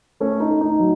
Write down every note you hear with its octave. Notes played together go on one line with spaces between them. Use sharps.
A3 C#4
D#4
A3
D#4
F#3